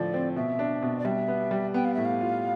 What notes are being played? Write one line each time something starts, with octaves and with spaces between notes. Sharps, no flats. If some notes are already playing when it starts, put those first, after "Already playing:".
Already playing: A2 D3 F3 D5
C4
B2 E5
D4
B2
D5
G3 E5
B3
G3
B3 G5
F5
A2 E5
F5
F4